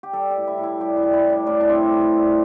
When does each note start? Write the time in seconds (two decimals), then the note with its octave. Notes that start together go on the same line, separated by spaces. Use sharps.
0.03 G4
0.13 G3 A4
0.31 G4
0.37 A2
0.47 E4
0.58 A2
0.63 E4
0.81 G3 G4
0.97 E4
1.03 G3
1.13 E4
1.24 A2
1.30 D4
1.47 A2 D4
1.61 D4
1.69 C4
1.90 A2
2.13 G3